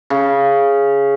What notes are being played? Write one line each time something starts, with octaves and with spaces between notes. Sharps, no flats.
C#3